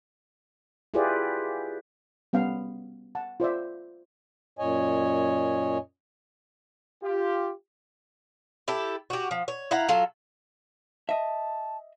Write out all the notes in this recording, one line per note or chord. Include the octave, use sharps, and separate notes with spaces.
E4 F4 G4 G#4 B4 D5
G3 B3 C#4 F5
F#5 A5
F4 C5 D5 E5
F#2 A#2 C#5 D#5 G#5
F4 G4
E4 G4 A4
F#4 G4
F3
C#5
E4 F5 F#5 A#5
F#3 F4 A4
D#5 E5 A5